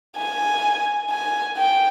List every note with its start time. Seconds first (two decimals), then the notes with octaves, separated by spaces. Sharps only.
0.17 G#5
1.10 G#5
1.57 G5